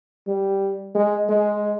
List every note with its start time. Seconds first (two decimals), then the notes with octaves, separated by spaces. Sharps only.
0.28 G3
0.95 G#3
1.29 G#3